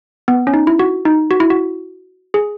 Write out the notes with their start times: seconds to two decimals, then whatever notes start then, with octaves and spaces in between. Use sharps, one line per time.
0.28 B3
0.47 C#4
0.54 D#4
0.67 E4
0.79 F#4
1.05 D#4
1.31 F#4
1.40 E4
1.50 F#4
2.34 G#4